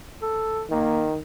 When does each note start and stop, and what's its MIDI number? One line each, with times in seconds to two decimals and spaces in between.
0.22 0.62 69
0.70 1.20 51
0.70 1.05 58